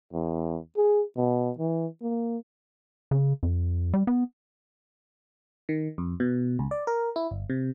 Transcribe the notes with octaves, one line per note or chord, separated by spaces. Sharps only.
E2
G#4
B2
E3
A#3
C#3
F2
G3
B3
D#3
F2
B2
C#2
D5
A#4
E4
G1
C3